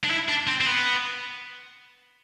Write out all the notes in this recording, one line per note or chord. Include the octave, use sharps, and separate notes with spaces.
D4
E4
D4
C4
C4
B3